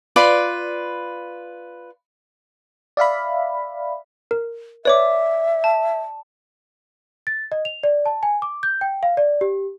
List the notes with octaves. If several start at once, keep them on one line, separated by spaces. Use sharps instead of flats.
F4 B4 D5 B5
D5 E5 F5 B5
A#4
B4 C#5 D5 E5 D6
A5
A6
D#5
F7
D5
A5
G#5
D6
G6
G5
F5
D5
G4